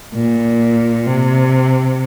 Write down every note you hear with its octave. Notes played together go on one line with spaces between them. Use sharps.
A#2
C3